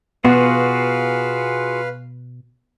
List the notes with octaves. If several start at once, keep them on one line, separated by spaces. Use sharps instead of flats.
B2 B3 F4 F#4 G#4 B4 F5 F#5